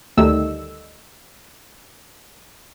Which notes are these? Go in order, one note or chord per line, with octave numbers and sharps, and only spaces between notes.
D2 D#3 G3 A3 D#4 E6